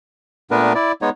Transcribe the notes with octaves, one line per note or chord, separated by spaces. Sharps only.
A#2 A3 B3 D4 A#4 B4
E4 D5
G#3 B3 D#4 C#5